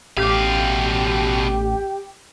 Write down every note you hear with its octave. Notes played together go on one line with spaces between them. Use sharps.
A1 B2 G4 F5